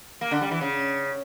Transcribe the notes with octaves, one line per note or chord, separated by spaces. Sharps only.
A#3
D3
G3
E3
C#3